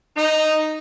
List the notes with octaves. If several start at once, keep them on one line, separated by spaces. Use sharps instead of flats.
D#4